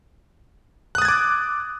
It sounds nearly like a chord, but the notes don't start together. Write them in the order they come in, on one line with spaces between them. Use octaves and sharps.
F#6 D#6 A6 G#6 D6